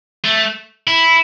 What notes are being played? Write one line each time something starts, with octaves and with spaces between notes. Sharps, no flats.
A3
E4